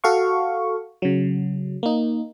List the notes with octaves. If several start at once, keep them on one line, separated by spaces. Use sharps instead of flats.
F#4 A4 F5 C#6
C#3 F#3
A#3 D#4